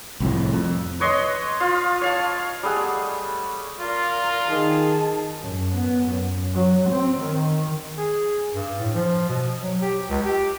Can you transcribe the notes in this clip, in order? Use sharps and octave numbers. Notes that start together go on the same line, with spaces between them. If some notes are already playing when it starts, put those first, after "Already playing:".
C2 F2 A2
F2
B4 C#5 D#5 C6
F4 F5
C#5 F5 A5
G3 A3 G#4 F#5
F4 A#4 D5
D#3 G#4 A5
F#2
B3
F#2
F#3
C4
D#3
G#4
G2
A2
F3
B2
F#3
G4
C#2
G4